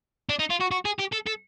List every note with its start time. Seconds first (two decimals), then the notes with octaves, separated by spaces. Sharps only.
0.29 D4
0.39 D#4
0.50 F4
0.60 F#4
0.71 F#4
0.85 G#4
0.99 G4
1.13 A4
1.27 A4